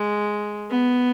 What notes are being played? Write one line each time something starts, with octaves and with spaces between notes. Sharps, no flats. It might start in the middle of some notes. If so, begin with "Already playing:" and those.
Already playing: G#3
B3